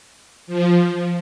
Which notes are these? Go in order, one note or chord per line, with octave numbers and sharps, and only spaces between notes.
F3